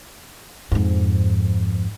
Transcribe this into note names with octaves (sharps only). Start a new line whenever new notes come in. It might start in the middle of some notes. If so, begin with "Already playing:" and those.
F2 G#2